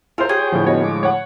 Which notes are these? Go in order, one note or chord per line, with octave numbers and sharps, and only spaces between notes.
F4 G#4 A#4 C5 E5
G4 G#4 C#5 G5
A2 D3 F3
B3 F#4 G4 C#5 D#5
G#3 D6
C#5 F#5